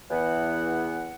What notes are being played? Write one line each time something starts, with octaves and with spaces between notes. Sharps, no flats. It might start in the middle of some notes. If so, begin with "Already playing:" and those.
E2 E3 B3 F#5